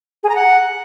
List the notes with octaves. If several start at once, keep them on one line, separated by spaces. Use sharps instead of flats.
G#4
A#5
F#5